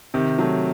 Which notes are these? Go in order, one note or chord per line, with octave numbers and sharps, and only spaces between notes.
C3 D#3
F#3 A3